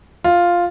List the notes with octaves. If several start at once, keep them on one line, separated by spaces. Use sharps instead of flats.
F4